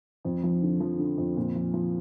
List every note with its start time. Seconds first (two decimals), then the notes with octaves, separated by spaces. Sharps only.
0.25 F2
0.43 F3
0.62 D3
0.80 F3
0.99 D3
1.18 F2
1.37 A#2
1.55 F3
1.74 F3